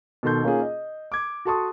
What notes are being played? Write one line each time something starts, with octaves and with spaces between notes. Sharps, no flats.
B2 D#3 A4 C6 G6
A#3 C#4 D#4 F4 G#4
D#5
D6 G#6
F#4 A4 A5 C6 C#6 D#6